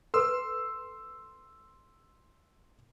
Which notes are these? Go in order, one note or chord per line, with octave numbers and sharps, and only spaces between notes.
A4 B4 C6 E6